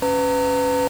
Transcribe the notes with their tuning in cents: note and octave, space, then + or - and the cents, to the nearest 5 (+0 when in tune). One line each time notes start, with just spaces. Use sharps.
C#4 +0 B4 +25 A#5 -35